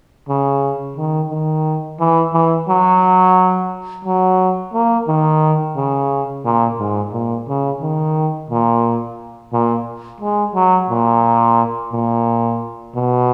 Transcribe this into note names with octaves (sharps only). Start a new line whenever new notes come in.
C#3
D#3
D#3
E3
E3
F#3
F#3
A#3
D#3
C#3
A#2
G#2
A#2
C#3
D#3
A#2
A#2
G#3
F#3
A#2
A#2
B2